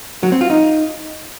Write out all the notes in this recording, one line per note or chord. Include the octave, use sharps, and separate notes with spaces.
F#3
C4
F4
D#4